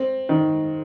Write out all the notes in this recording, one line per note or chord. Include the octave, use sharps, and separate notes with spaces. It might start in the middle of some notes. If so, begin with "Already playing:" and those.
Already playing: C4
D#3